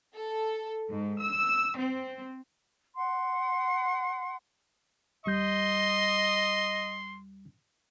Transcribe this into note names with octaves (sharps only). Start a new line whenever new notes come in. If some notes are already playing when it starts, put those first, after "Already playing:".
A4
G#2
E6
C4
F#5 C6
D#2 G3 D#5 C6 G6